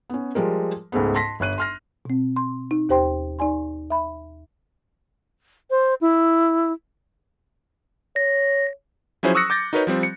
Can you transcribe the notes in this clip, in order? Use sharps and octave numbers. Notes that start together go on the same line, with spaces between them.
B3 C#4
F3 G3 G#3 A#4
C#2 G#2 G#3 A3 B3
A5 C6 A#6 B6
G1 C#5 F#6 D#7
C6 F6 A#6
B2 C4
C6
D#4
D#2 G4 C5 G5 C6
D#4 D5 G#5 C6
E5 B5
C5
E4
C#5 A#6
F3 F#3 C#4 E4 G#4 C5
C#6 D#6 E6 F#6 A#6 C#7
D6 G6 A6 A#6
D#4 F#4 A#4 B4 C#5 D#5
F3 G3 C4
C#7